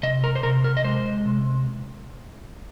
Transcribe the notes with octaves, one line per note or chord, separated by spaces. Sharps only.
C3 D#5
A#4
C5
C3 A#4
A#4
D#5
G#3 C5
C3